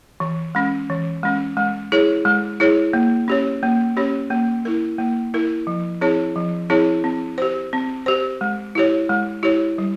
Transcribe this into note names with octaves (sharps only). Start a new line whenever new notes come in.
E3
G#3 C#4
E3
G#3 C#4
G#3
E4 G#4 C#5
G#3
E4 G#4 C#5
A#3
C#4 G4 C#5
A#3
C#4 G4 C#5
A#3
E4 A#4
A#3
E4 A#4
F3
C4 E4 G#4 C#5
F3
C4 E4 G#4 C#5
C4
G4 C5
C4
G4 C5
G#3
E4 G4 C#5
G#3
E4 G4 C#5
G3